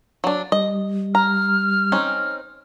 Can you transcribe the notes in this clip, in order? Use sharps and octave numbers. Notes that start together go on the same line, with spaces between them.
F#3 D4
G3 D#5
A#5 F6
C4 C#4 D#4